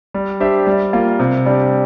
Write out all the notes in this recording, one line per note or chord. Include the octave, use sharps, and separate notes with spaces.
G3
D4 G4 C5 E5
G3
A#3 F4
C3
G3 D4 G4 D5